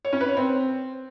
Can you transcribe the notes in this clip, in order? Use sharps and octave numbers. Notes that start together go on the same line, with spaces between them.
C#5
C#4
B4
C#5
C4